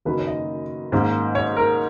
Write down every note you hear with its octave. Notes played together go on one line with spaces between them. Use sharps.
F#1 F#2 D#3 A#3 C#4 B4
C#5
D#5
G#2 D#3 A#3 C#4
C#5
A#4